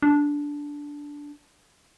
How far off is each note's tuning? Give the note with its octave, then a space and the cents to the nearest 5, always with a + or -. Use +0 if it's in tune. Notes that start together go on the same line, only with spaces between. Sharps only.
D4 -10